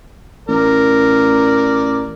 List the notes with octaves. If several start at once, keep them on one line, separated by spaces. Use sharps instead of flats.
A1 A#4 D5